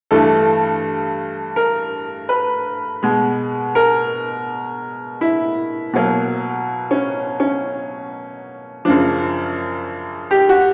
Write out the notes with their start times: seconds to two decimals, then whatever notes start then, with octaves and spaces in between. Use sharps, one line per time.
0.11 G2 E3 A3 A4
1.56 A#4
2.29 B4
3.03 B2 G#3
3.75 A#4
5.21 E4
5.93 B2 F#3 A#3
6.91 C#4
7.40 C#4
8.85 F#2 C#3 F3 D4
10.31 G4
10.49 F#4